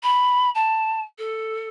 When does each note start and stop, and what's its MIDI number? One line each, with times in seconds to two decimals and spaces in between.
0.03 0.50 83
0.55 1.02 81
1.18 1.68 69